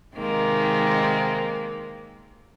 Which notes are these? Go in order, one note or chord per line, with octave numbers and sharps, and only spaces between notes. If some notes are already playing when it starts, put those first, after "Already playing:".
C3 D#3 G#3 A#3 C4